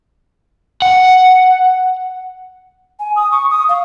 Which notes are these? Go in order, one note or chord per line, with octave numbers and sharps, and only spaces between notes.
F#5
G#5
D#6
C#6
D#6
F5